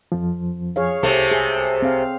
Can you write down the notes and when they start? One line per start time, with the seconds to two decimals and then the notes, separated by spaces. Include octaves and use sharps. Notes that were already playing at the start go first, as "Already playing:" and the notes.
0.12 F2 F3
0.76 G#4 C#5 F5
1.03 C2 C3 A3
1.32 G#4 A4
1.82 C4 F5